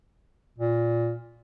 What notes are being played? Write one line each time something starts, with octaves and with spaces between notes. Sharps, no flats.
A#2